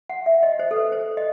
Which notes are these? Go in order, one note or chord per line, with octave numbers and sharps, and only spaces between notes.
F#5
E5
D#5
C5
A4
B4
C5
D#5